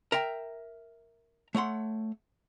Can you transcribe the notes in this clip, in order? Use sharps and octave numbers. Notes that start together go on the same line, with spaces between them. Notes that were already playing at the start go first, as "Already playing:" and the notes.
A#4 E5 G5 A#5
A3 C#5 F#5 C6